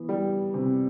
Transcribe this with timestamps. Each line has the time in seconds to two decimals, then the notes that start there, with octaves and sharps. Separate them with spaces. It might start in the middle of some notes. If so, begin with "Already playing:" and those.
Already playing: E3 B3
0.09 G3
0.54 C3